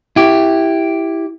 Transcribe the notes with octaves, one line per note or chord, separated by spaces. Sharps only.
E4 G4